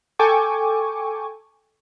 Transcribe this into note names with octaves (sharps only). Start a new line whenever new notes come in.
A4 G5 G#5 C#6 D6